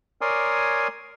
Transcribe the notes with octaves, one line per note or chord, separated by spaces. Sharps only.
A#4 C#5 D5 G#5 C6 D#6